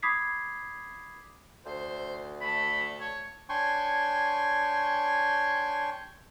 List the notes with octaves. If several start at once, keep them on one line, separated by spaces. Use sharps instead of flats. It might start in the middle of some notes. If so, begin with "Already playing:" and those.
B5 D6 D#6 G#6 B6 C7
D2 C5
A3 A4 B5
C#5
D4 C#5 G5 G#5 C6 C#6